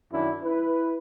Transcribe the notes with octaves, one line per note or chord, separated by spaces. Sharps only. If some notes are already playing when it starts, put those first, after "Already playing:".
F#2 D#3 D4 E4
E4 B4